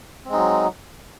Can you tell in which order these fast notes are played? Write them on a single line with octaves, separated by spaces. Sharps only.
C4 G#3 D#4 F#3